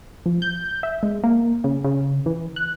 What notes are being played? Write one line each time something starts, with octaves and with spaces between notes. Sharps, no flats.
F3
G6
E5
G#3
A#3
C#3
C#3
E3
F#6